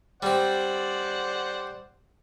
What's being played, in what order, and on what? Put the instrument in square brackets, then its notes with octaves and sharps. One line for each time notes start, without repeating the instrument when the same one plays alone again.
[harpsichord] G3 C4 [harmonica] C5 D5 F#5